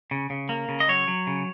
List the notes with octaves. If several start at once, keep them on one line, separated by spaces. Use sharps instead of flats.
C#3
C#3
A#3
C#3
D#5
F#3 C#5
F#3
C#3